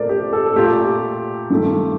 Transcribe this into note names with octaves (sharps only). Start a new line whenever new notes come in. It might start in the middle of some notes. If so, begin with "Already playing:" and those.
Already playing: A#2 A3 A#4 C5 D5
G4
A4
A#2 A3 G4
G2 D#3 A3